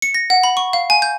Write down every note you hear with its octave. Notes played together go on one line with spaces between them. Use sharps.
C#7
A#6
F#5
B5
C#6
F5
G#5
G6